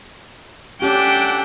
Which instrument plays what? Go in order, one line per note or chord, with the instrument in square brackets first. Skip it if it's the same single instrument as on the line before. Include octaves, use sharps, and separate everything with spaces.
[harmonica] A3 D4 F#5 [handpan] C#4 G4 [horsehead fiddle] G5